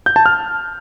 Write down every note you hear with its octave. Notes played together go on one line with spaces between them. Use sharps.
G6
A5
F6